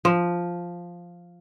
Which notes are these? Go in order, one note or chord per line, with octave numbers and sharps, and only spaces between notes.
F3